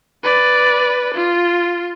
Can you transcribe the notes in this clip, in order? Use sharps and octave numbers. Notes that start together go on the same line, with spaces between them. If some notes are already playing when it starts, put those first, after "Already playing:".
B4 D5
F4